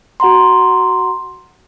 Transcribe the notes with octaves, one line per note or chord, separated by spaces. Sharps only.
F#4 F#5 A#5 C6